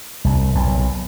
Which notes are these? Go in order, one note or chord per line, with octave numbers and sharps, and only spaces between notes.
C2
B1 A#2